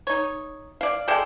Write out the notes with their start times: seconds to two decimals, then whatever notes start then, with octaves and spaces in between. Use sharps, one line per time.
0.07 D#4 C#5
0.81 D5 F5
1.08 G#3 A4 D5 G5